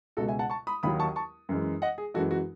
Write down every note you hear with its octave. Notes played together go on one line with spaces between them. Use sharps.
C#2 B2 G#3 F#4 A4
E5 G#5
F#5 A5
A5 C#6
B5 D#6
D#2 D#3 F#3 B5 D#6
A5 C#6
A5 C#6
F#2 E3 G#3
D#5 F#5
G#4
F#2 E3 G#3 F#4 A4
F#4